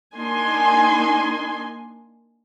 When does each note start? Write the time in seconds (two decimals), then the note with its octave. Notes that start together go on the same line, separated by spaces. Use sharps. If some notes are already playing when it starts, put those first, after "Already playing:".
0.13 A#3 D4 D#4 G#5 C6